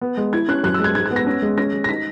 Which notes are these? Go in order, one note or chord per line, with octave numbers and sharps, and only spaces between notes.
B3
G#3
E4 G#6
C#4 F#6
F#2 F#6
E6
G#3 G#6
G#2 G#6
G#6
B3
A#6
C#4
G#3
C#4 A#6
G#3
A#6
D#4 B6